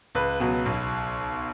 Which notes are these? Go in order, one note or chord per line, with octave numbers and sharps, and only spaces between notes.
C#2 B4
B2 F#3
B1